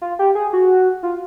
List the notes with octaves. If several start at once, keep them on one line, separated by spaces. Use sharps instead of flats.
F4
G4
G#4
F#4
F4